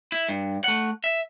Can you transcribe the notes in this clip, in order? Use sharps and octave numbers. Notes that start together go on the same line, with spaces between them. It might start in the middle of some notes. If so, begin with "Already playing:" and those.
E4
G2
A3 F#5
E5